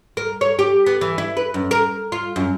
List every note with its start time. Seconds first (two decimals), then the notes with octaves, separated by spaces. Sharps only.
0.17 A#4
0.41 C#5
0.59 G4
0.86 B3
1.01 E3
1.18 E4
1.37 B4
1.54 F#2
1.71 A#4
2.12 F4
2.36 F#2